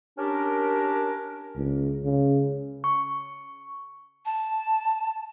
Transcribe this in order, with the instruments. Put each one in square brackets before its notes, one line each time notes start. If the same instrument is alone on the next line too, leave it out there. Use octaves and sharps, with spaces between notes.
[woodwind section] C#4 D4 G4 A#4
[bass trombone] C#2
C#3
[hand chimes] C#6
[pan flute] A5